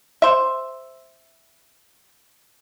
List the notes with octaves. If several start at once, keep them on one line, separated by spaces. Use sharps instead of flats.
C5 E5